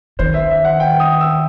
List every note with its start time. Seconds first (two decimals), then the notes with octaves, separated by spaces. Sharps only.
0.19 D#3 C5
0.34 E5
0.50 E5
0.65 F#5
0.80 G5
1.00 D#6
1.21 E6